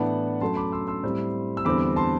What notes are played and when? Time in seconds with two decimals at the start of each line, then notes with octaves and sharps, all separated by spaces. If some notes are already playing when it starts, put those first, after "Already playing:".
Already playing: A2 E3 B3 D4 F#5 A5
0.41 F#2 F#3 A3 A5 C6
0.56 B5 D6
0.72 C6 E6
0.87 C6 E6
1.03 A2 G3 C4
1.57 E6
1.65 E2 D3 G3 C4 B5 D6
1.96 A5 C6